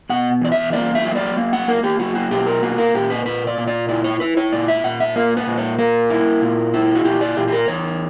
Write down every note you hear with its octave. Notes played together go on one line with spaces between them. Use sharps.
B2 F#5
E2 D5
E5
A#3 D5
E5
F#3
D5
A#3
F#5
A#3 A#4
G4
F#3 F#4
F#4
B2 G4
A#4
A#3 F#4
A#4
A#2 G4
B4
A#2 B4
D5
A#2
D5
E4 D5
C#5
E4 B4
C#5
A#2 D5
E5
A#2 F#5
E5
A#3 A#4
B4
A#2
C#5
A#3 A#4
E4
A#2
E4
F#4
A#2 G4
D5
A#2 G4
G4
A#4
E2 C#5